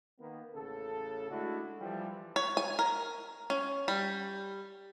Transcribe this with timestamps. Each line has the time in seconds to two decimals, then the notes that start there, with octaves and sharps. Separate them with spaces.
0.20 D#3 A#3 B3
0.54 A1 C#3 A4
1.30 G#3 A3 D4 E4 F#4
1.80 E3 F3 G3
2.36 C#5
2.57 G#5
2.79 A#4
3.50 C#4
3.88 G3